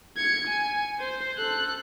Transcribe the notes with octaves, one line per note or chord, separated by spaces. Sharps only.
G#6 C#7
G#5
C5
A4 F#6